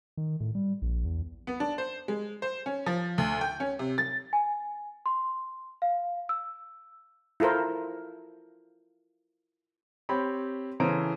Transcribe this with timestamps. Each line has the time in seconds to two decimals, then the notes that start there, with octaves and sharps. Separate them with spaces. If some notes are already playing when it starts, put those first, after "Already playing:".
0.17 D#3
0.40 A2
0.55 G3
0.82 A#1
1.05 E2
1.47 B3
1.60 D4
1.78 C5
2.08 G#3
2.42 C5
2.66 C#4
2.86 F3
3.18 D2
3.41 G5
3.60 C#4
3.79 C3
3.98 A6
4.33 G#5
5.06 C6
5.82 F5
6.29 E6
7.40 E4 F4 A4 A#4 C5
10.09 C4 G4 C#5 B5
10.80 C#3 E3 A4 C5 A#5 D7